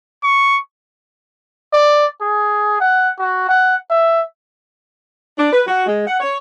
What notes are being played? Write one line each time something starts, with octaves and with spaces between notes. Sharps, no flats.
C#6
D5
G#4
F#5
F#4
F#5
E5
D4
B4
F#4
G#3
F#5
C#5